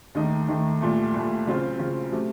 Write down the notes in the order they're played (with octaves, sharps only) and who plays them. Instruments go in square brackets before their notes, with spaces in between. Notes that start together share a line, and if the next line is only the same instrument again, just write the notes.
[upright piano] D#2 D#3 A3 D#4
D#2 D#3 A3 D#4
C2 A#2 A3
C2 A#2 A3
C#3 F#3 C4 F4
C#3 F#3 C4 F4
C3 F#3 A3